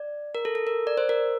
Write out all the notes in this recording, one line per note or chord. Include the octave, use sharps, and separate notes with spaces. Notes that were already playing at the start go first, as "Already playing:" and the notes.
Already playing: D5
A#4
A4
A4
A#4
D5
C5
A#4